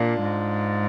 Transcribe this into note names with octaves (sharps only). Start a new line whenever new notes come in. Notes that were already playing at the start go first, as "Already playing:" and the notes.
Already playing: A#2 D4 F4
G#2